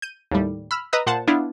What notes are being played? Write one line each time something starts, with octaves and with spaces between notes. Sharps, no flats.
G6 D#7
D#2 A2 G3
B5 E6 F6
B4 D#5 A#5 D#6 E6 F#6
A#2 C5 F#5 A5
B3 D4 E4 F4